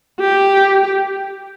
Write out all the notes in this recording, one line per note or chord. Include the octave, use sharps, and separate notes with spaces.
G4